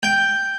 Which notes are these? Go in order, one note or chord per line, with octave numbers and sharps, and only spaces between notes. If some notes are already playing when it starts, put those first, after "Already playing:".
G5